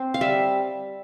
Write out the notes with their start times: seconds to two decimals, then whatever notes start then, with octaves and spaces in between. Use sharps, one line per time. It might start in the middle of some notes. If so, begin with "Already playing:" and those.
Already playing: C4 C5
0.14 F5
0.21 G3 E5